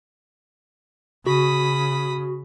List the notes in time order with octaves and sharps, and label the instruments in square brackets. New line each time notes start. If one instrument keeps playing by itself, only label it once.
[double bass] C#3 [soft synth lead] F#4 [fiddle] B5 D#6